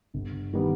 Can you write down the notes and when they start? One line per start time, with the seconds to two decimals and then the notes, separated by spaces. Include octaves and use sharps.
0.14 G1
0.53 D#3 G3 B3